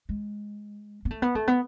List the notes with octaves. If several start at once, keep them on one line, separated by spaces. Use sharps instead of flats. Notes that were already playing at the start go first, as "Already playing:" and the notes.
G#3
B3
A3
B3
A3
B3